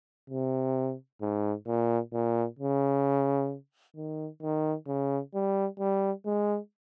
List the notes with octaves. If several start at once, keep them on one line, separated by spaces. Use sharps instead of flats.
C3
G#2
A#2
A#2
C#3
D#3
D#3
C#3
G3
G3
G#3